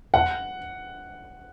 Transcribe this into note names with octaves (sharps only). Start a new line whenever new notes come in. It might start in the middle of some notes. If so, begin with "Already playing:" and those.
F#5